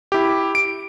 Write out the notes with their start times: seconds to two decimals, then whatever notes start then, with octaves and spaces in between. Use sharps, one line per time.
0.12 E4 G4
0.55 D7